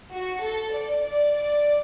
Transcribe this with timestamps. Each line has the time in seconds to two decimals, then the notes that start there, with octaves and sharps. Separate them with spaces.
0.12 F#4
0.43 A4
0.74 D5
1.05 D5
1.36 D5